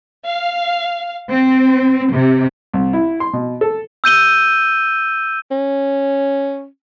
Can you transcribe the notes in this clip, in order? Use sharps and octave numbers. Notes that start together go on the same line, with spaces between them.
F5
C4
C3
C2
E4
C6
B2
A4
E6 G6 D#7 G7
C#4